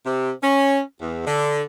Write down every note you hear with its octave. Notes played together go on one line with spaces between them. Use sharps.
C3
C#4
E2
D3